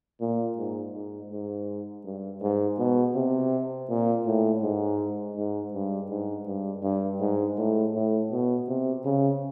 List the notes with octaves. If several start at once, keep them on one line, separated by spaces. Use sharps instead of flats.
A#2
G#2
G#2
G#2
G2
G#2
B2
C3
A#2
A2
G#2
G#2
G2
G#2
G2
G2
G#2
A2
A2
B2
C3
C#3